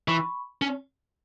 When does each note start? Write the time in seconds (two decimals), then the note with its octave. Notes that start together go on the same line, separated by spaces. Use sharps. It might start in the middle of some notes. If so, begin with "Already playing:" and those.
0.08 E3 B5 C#6
0.62 C#4